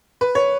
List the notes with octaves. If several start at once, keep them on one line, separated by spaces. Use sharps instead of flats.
B4
C#5